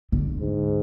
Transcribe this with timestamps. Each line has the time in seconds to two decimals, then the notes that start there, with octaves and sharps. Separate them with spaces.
0.12 D3
0.40 G#2